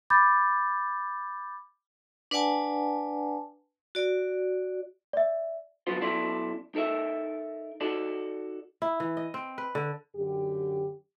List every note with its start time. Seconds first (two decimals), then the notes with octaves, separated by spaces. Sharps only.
0.10 B5 D6 G6 A6
2.31 D4 B4 D5 F#5 G#5 A5
3.95 F#4 D5
5.13 D5 E5
5.87 D3 F3 F#3 B3 F4 C5
6.01 F#2 B2 E4 A4 D5 C6
6.75 D#4 A4 A#4 E5
7.81 D#4 F#4 A4 D5
8.82 E4
9.00 E3
9.17 D#5
9.34 C4
9.58 B4
9.75 D3
10.15 F#2 D3 G4